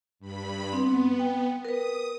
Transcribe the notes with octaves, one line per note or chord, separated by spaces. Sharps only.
G2 B5
B3 C4
G5
A#4 B4 D#6